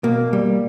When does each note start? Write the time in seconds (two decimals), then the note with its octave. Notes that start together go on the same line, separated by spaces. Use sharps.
0.03 B2 A#3
0.33 G3